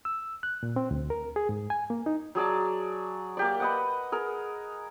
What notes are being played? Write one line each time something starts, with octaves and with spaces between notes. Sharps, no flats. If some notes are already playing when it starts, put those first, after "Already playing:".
E6
F#6
A#2
C4
D2
A#4
G#4
G#2
G#5
A#3
D#4
F#3 G#4 D5 A5
A#3 G4 D5
B4 D#5 F#5
G#4 A#4